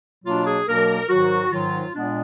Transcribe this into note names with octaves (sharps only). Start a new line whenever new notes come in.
B2 F#3 A#3 D4 F4
G#4
B2 F#3 A#3 D4 A#4
G#2 D#3 F#3 F#4
G#2 D#3 F#3 F4
A#2 G#3 B3 D4